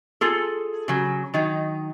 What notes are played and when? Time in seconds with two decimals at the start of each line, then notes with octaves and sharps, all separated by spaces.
0.21 F4 G#4 A4
0.88 C#3 F#3
1.34 D#3 F#3 D#4